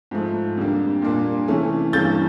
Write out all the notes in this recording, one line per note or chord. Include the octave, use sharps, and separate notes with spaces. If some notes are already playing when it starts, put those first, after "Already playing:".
G#2 F3 A3
F2 D3 G3 A#3
A#2 G3 A#3 D4
C3 E3 A3 C#4
G2 E3 G3 A#3 C#4 G6 A6